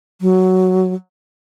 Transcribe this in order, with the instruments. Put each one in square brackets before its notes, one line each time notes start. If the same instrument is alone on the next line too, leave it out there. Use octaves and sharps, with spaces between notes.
[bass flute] F#3